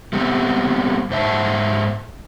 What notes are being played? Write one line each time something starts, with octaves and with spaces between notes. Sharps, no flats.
G3 A3 B3 C4
G#2 C5 E5 A5